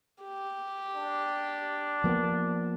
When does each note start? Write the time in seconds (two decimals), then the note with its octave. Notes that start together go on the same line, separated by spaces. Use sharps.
0.24 G4
0.96 D4
2.04 F3 A#3 B3